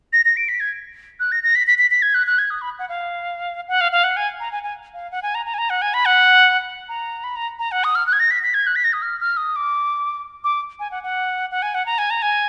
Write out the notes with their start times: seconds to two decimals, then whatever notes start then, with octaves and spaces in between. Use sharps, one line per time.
0.13 A#6
0.25 A#6
0.37 D7
0.49 B6
0.60 G#6
1.20 F#6
1.32 A#6
1.43 A#6
1.55 B6
1.67 B6
1.78 B6
1.91 B6
2.02 G#6
2.14 F#6
2.27 F#6
2.38 G#6
2.50 D#6
2.61 B5
2.79 F#5
2.89 F5
3.68 F#5
3.81 F5
3.92 F5
4.04 F#5
4.17 G#5
4.40 A#5
4.52 G#5
4.63 G#5
4.94 F5
5.11 F#5
5.22 G#5
5.35 A#5
5.46 A#5
5.54 G#5
5.58 A#5
5.70 F#5
5.82 G#5
5.94 B5
6.05 F#5
6.89 A#5
7.24 B5
7.36 A#5
7.59 A#5
7.72 F#5
7.84 D#6
7.95 F6
8.07 F#6
8.13 G#6
8.20 A#6
8.31 B6
8.43 B6
8.54 G#6
8.67 F#6
8.76 B6
8.84 A#6
8.93 D#6
9.02 F6
9.20 F6
9.37 D#6
9.56 D6
10.44 D6
10.79 G#5
10.91 F#5
11.03 F#5
11.51 F#5
11.62 G#5
11.74 F#5
11.86 A#5
11.98 G#5
12.10 A#5
12.22 G#5